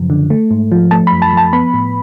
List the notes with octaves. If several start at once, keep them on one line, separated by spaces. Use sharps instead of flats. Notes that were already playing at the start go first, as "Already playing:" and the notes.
Already playing: F#2 C#3 F3
D3
A3
G#2
F3
A3 A5
B5
F#2
A5
F3 A5
B3 B5
A2